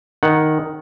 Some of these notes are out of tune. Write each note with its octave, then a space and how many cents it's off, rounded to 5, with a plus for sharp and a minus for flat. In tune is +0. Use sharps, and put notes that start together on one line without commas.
D#3 +0 F#5 +0